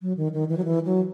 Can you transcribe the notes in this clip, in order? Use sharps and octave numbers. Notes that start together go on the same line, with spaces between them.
F#3
D#3
D#3
E3
F#3
E3
F#3